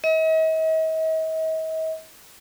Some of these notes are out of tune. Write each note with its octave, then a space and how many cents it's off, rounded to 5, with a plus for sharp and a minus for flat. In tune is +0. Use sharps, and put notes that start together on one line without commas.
D#5 +45